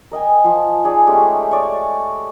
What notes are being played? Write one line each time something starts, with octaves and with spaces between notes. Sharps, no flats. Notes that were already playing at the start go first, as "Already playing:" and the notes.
A#4 D#5 G5 G#5
F3 A5
D#4 G#4 D5
G#3 A3 C#4 G4
C#5 D5 C#6